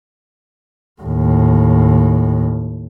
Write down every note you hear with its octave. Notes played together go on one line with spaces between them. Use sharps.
D#2 A2